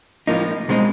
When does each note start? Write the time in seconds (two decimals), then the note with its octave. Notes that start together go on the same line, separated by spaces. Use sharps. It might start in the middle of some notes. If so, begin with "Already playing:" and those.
0.27 A2 F3 A#3 D#4
0.69 B2 G#3 C4 D#4